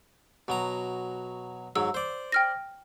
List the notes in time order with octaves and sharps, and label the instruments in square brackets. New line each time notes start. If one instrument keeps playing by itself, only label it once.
[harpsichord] B2 F#3 A#5
[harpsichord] G#2 F#3 [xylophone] E6
[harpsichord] C5 D5
[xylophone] G5 F6 A#6